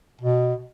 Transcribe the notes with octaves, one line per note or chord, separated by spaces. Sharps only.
B2